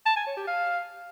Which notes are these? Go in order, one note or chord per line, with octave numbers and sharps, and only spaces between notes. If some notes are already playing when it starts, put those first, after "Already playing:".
A5
G#5
C#5
G4
F5